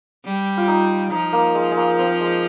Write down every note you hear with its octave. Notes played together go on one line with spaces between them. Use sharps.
G3
F4
D#4
F3 D#4
A#3
G#3
G#3
A#3
C4
G#3